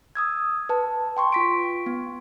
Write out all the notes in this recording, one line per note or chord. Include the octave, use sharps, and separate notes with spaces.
D#6 E6 G#6
B4 A5
G5 C6 C#6
F4 B6 D7
B3